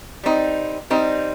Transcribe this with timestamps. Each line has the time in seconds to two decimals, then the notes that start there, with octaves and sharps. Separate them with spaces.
0.23 G3 C4 D#4
0.90 G3 C4 D#4